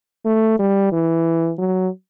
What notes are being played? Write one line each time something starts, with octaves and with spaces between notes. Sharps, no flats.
A3
G3
E3
F#3